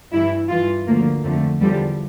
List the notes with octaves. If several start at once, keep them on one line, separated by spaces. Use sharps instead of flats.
G2 E3 E4
G2 E3 F4
D2 D3 F3 A#3
F2 D3 F3 A3
E2 D3 F3 G3